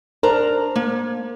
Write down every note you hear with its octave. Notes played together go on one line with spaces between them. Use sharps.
D4 A#4 C5 A#5
A#3